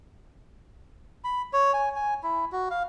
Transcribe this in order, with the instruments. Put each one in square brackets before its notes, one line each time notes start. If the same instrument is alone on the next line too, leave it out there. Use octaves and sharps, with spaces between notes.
[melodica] B5
C#5
G#5
G#5
E4
F#4
F5